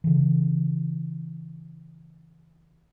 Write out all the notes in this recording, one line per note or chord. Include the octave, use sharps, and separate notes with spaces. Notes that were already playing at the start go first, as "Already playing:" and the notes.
C#3 E3